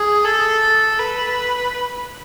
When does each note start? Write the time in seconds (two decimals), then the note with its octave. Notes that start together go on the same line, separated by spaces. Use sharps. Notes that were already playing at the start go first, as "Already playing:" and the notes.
Already playing: G#4
0.24 A4
0.99 B4